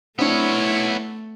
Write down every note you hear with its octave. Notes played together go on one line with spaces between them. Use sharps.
A3 B3 C4 D4 E4 C#5